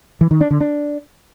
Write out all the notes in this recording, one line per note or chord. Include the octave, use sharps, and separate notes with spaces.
E3
D#3
D4
D3
D4